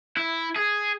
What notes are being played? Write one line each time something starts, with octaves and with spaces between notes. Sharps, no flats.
E4
G#4